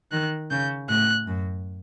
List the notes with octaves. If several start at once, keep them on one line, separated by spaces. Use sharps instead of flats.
D#3 F#6
C#3 G6
A2 F#6
F#2